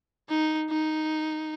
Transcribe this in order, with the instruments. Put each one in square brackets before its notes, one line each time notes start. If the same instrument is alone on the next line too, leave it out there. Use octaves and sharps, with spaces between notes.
[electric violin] D#4
D#4